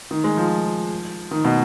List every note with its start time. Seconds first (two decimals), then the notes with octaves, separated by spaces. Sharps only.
0.11 D#3
0.24 G#3
0.37 F3
1.31 D#3
1.45 B2